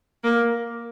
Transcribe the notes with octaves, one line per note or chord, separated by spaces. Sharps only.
A#3